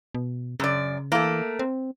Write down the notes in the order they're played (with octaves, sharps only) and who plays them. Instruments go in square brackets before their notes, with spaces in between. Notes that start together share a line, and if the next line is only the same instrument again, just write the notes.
[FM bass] B2
[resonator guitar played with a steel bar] F#2 D5 [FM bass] C#3
[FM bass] E3 [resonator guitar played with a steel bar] A3 A#3
[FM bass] C4